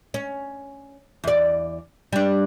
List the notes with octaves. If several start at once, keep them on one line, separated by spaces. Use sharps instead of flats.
C#4
E2 D5
G3 D4